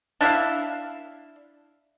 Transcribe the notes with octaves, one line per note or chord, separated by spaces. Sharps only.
D4 E4 E5 F5